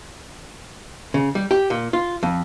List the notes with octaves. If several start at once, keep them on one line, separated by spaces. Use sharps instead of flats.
C#3
G3
G4
A#2
F4
F2